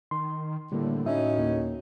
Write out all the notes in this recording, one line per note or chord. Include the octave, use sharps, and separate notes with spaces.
D#3 C6
A2 D3 G3 A#3
A2 C#4 D#4 F#4 E5
D2 A#3